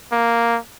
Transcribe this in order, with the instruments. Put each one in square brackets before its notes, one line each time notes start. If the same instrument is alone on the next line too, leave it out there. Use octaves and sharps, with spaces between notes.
[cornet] A#3